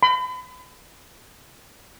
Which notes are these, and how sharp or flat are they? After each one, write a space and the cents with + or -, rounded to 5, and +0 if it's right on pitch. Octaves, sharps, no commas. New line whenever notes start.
B5 +35